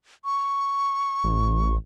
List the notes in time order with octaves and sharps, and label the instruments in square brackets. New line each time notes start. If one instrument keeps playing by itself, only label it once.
[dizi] C#6
[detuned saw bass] A1